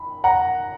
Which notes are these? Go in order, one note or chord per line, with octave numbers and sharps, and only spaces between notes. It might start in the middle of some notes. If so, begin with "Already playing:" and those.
Already playing: B5
F#5 A#5